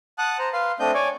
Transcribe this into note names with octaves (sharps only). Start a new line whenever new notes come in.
F#5 A5 D#6 F#6
C5 A#5
B4 F5 C6
A3 C4 D4 D#5 G6
C#5 D5 G#5